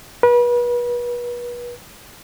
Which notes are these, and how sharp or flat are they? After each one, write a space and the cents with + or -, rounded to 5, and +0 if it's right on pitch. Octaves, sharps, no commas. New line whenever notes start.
B4 -35